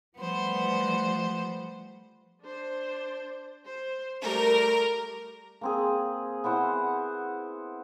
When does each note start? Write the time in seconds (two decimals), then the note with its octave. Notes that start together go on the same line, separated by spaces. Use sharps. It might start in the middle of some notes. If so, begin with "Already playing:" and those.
0.18 F3 G3 A3 B3 C5
2.42 D4 C5
3.65 C5
4.22 G3 A3 A#4
5.61 A#3 C4 G#4
6.44 B3 E4 C5 F#5